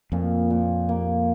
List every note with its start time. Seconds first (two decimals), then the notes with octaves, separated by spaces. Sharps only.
0.12 F2 A#2
0.50 A#2
0.89 A#3